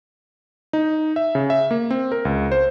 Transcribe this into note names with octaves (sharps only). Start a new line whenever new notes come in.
D#4
E5
C#3
E5
A#3
C4
A#4
C#2
C5